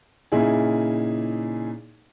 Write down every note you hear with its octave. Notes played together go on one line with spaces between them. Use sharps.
A#2 C#3 D#4 E4 G#4